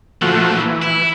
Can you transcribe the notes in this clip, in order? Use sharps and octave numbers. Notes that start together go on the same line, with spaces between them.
A#2 D3 F3 A3 F#4
E3
E4